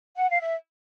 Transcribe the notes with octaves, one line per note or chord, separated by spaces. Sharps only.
F#5
F5
E5